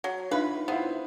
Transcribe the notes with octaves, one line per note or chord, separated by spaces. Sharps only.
F#3
D4 D#4 F4 B4 E5
B3 E4 F4 C5